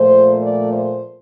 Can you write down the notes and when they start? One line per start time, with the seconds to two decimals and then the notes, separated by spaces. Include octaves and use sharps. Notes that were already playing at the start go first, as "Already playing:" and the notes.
Already playing: A#2 F3 A3 C5
0.42 D5
0.73 C5